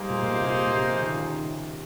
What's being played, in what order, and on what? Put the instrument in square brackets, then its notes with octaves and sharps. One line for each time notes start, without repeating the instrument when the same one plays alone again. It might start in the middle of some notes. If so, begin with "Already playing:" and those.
Already playing: [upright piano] G3 [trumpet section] A#3 D#4 G#4 C5
[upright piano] A#2
A#2
C3
C3
A#2
C3
F3
D#3
C#3
D#3
C#3